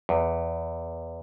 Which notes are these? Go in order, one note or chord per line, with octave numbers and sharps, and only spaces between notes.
E2